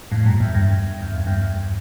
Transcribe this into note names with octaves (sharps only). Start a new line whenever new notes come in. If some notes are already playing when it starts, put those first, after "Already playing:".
F2 A2
G2 A#2
E2 G2
E2 G2
E2
F2
E2 G2